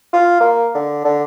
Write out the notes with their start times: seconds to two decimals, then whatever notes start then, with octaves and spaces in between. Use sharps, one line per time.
0.13 F4
0.40 A#3
0.75 D3
1.05 D3